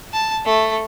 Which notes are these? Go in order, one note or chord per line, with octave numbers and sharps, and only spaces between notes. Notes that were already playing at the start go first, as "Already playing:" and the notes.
A5
A3